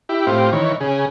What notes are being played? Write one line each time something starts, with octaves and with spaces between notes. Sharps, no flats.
E4 G4
A2 C4 F4 G4
D#3 E3 C#5
C#3 G#4